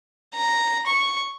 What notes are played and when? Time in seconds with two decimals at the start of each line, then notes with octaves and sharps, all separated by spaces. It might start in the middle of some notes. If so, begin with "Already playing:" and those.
0.35 A#5
0.86 C#6